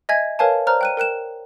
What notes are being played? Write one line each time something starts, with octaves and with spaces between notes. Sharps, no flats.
D#5 E5 G#5 G#6
A#4 B4 C#5 F5 G#5 A5
C5 D5 A#5 F6 F#6
G5 F#6 D#7
A#4 G5 F#6 E7